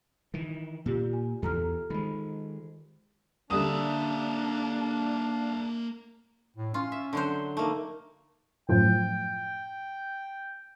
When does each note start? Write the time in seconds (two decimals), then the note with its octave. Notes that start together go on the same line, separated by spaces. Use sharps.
0.34 D#3 E3
0.86 A#2 F4 G4
1.13 G#5
1.42 E2 E3 A4 A#5 F6
1.90 D#3 G#3 B5
3.50 D3 G3 A#3 D4 E5 D#6
6.57 A2
6.74 C#4 F4
6.92 E5
7.13 D3 F#3 C5
7.57 A3 A#3 D#4
8.69 F#2 A2 F3 G5